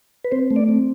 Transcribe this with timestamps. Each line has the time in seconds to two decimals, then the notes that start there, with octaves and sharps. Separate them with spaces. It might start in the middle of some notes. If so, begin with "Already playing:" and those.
0.24 B4
0.32 C4 C5
0.51 A3
0.56 D5
0.69 C4